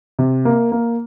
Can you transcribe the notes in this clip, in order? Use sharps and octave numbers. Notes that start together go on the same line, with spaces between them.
C3
A#3
A#3